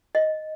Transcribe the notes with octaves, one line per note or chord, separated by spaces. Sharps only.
D#5